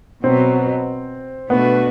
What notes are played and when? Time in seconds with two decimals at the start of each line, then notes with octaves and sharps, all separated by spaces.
0.23 B2 F#3 B3 C4
1.50 B2 A3 B3 D4 F#4 B4